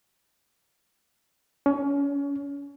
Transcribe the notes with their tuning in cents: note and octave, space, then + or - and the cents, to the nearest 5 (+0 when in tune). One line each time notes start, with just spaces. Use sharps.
C#4 +30